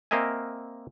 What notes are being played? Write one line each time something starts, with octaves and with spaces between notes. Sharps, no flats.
A#3 C4 A#4 D#5 E5 G#5